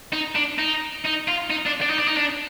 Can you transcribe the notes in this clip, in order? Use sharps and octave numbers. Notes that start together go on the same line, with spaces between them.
D#4
D4
D#4
D#4
F4
D#4
D4
D4
D#4
D4
D#4
D4